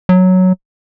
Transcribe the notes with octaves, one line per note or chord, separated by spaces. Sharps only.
F#3